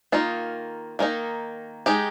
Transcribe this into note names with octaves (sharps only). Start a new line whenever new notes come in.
D#3 A#3 D#4 F4
D#3 A#3 D#4
G#3 D#4 G4